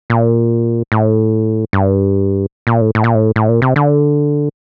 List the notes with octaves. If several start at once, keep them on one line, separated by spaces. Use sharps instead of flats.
A#2
A2
G2
A#2
A2
A2
A#2
A2
A2
A#2
C3
D3